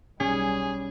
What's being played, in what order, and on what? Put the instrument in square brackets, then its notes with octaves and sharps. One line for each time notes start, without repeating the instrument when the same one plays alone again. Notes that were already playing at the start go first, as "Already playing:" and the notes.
[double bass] B1 G3 [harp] C#4 [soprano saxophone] G#4